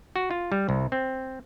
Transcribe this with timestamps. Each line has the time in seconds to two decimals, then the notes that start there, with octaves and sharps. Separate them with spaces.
0.16 F#4
0.31 F4
0.52 G3
0.69 C2
0.92 C4